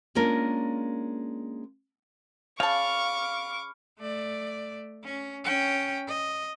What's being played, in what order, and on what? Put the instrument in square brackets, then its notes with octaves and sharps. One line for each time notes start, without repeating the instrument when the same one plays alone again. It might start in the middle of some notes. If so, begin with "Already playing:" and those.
[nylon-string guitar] G#3 A#3 C#4 D4 F4 A#4
[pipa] C#3 A5 [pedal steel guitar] F5 [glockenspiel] B5 F6 [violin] C#6 D6
[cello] A3 D5
C#4
C#4 G5
D#5